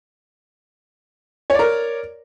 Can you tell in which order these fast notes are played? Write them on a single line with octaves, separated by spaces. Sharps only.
C#5 D5 A#4